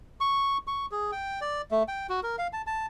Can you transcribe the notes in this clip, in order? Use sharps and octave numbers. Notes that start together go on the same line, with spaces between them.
C#6
C#6
G#4
G5
D5
A3
G5
F#4
A#4
F5
A5
A5